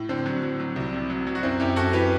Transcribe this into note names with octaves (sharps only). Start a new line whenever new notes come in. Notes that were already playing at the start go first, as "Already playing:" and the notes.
Already playing: A2
D3 C4
F#3
F#3
F#3
C2
C3
F#3
F#3
F#4
F#2 C4 E4
F#2 E4 G4
F#2 F#4 A4
E3 G4 B4